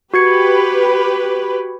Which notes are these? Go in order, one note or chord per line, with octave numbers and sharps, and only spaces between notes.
F#4 G4 B4 G#6 C#7